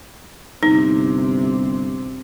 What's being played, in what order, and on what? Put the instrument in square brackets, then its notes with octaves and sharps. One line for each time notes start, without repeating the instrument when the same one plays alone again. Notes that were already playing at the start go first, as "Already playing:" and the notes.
[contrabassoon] G1 [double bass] C3 C4 [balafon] D#4